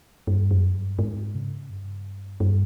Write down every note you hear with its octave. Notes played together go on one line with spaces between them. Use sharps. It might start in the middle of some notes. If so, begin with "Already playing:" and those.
G2
F#2
G2
G#2
C#3
G2
G2